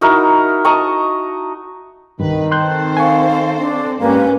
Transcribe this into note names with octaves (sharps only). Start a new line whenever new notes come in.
D#4 E4 F#4 A#4
D#5 A5 A#5 C#6
C2 G2 D#3 B4
C4 A4 C5 C6 F#6 G6
F5 G#5 C#6
D4
G#2 G3 A#3 C#4 B4